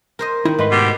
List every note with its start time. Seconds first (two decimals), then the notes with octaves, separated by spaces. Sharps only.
0.19 A#4 C5 D#5
0.45 D#3 D#4 E4
0.59 G#2 A3 B4 D#5 C6
0.72 B2 G4